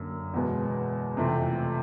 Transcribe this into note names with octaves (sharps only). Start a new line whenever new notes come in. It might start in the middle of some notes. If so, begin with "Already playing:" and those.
Already playing: F#2 D3 A#3
E2 B2 G#3 B3
F2 C3 E3 A3 C4